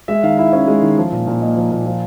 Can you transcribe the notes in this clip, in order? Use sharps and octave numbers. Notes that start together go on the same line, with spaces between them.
G#3 E5
D#3 F5
E4 E5
C#4 E5
G#3
D#3
F3
A#2
A#2
A#3 D#5
F3
A#2
F3